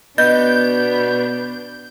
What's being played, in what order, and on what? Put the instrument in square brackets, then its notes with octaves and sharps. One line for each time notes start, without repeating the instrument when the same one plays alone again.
[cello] B2 D4 [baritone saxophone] B3 [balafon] D#5 [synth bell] G6